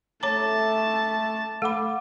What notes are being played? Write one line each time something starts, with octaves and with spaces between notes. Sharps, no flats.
A3 C#5 A5 A#5 D6
A3 A4 F#5 B5 D6